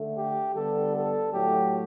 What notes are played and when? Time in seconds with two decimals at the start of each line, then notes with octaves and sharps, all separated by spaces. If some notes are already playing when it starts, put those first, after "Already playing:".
Already playing: D3 A3
0.17 G4
0.55 D3 G3 B3 A4
0.95 A4
1.33 A2 F#3 A3 G4